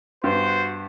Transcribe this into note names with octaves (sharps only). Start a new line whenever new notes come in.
G2 B3 F#4 C5